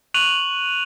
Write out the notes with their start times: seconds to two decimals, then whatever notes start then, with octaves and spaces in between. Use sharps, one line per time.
0.14 C#6 F#6 D#7 F7 F#7